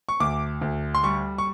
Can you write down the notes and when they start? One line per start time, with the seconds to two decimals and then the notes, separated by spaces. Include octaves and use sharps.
0.09 C#6
0.20 D2 D6
0.61 D2
0.95 C6
1.03 G3 C#6
1.38 C#6